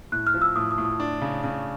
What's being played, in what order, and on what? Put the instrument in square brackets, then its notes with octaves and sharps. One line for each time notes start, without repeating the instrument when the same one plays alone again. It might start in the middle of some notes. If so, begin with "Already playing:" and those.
[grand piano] A2 [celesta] F#6
[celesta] F6
[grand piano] F3
[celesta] E6
[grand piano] A2 [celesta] D#6
[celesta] D#6
[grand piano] A2
[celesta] D#6
[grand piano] D4
C#3
C#3